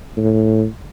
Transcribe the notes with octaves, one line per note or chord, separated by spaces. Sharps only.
A2